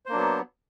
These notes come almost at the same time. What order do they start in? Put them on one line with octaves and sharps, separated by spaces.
C5 A#3 D4 F#3 B3